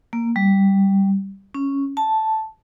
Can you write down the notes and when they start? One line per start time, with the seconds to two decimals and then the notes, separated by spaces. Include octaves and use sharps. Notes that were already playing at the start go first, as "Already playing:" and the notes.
0.13 A#3
0.36 G3
1.55 C#4
1.97 A5